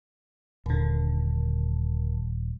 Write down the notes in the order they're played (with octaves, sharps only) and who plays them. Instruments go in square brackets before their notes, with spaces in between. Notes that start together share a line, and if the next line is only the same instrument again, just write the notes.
[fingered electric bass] D#1 [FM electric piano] D#2 D3